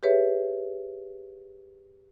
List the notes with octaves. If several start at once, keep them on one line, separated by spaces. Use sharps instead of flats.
G4 G#4 B4 C#5 E5